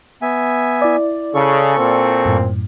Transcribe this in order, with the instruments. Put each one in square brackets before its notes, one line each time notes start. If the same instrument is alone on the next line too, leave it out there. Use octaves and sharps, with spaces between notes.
[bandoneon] B3 E5 G#5
[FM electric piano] E4 D5
[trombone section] C#3 [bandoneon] A4 C#6
[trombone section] A#2 C4
[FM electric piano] F#2 A2